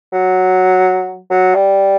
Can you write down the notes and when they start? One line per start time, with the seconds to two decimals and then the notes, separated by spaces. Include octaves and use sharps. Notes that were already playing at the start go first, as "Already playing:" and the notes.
0.13 F#3
1.31 F#3
1.55 G3